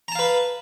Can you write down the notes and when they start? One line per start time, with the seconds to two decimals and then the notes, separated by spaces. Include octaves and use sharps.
0.08 A#5
0.12 A5
0.15 F5
0.19 B4